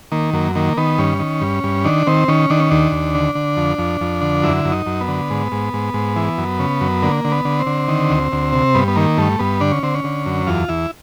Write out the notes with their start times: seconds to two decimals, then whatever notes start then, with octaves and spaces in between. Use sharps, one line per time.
0.12 D#3 A#3
0.33 F#2 A#3
0.55 D#3 A#3
0.77 D#3 B3
0.98 G2 C#4
1.19 D#3
1.41 G2
1.64 G2
1.85 D#3 D4
2.07 D#3 C4
2.28 D#3 C#4
2.50 D#3 D4
2.60 C#4
2.71 D#2 D4
2.92 D#2
3.15 D3
3.35 D3
3.57 F2
3.78 F2
4.01 F2
4.21 D3
4.43 F#2 E4
4.65 F#2
4.72 D#4
4.86 F#2
5.01 B3
5.08 D3
5.30 G#2
5.52 G#2
5.73 G#2
5.94 G#2
6.16 E3
6.38 F#2
6.59 C#3
6.81 F#2
7.02 D3 A#3
7.25 D3
7.32 B3
7.45 D3
7.60 C4
7.66 D3
7.88 D#3
8.10 D2
8.32 D2
8.53 C3
8.75 G2 B3
8.88 B3
8.96 D#3 A#3
9.17 G2 A3
9.39 G2 B3
9.61 D3 D4
9.72 C#4
9.83 D3 C4
9.94 C#4
10.04 D3
10.26 F#2
10.47 E2 F4
10.68 E2 E4